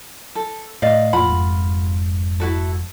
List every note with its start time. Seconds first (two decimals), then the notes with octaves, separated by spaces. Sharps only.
0.35 A4
0.82 A2 D5 D#5 F5
1.13 F2 A2 F4 F#5 B5
1.29 F1 F2 G#2
2.40 E4 F#4 A4